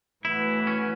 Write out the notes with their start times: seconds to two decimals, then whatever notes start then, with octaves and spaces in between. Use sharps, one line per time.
0.25 A2 E3 B3 E4 F#4
0.67 C#4